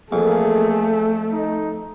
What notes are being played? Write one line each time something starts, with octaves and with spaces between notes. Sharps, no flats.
F2 E3 A3 A#3 G#4
D#4 D#5